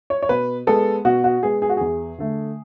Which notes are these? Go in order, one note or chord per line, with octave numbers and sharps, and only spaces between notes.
C#5
C#5
B2 B4
G#3 B3 A4
B2 F#4
F#4
G#3 B3 G#4
G#4
F#4
E2 G#4
D3 A3